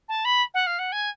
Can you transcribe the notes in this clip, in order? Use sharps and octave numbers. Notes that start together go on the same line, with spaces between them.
A5
B5
F#5
F5
F#5
G#5